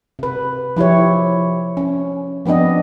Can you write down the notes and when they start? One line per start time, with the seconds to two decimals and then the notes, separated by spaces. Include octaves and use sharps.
0.19 C3 B4
0.77 F3 E4 G4 C#5
1.77 C#4
2.46 F3 B3 C4 D4 D#5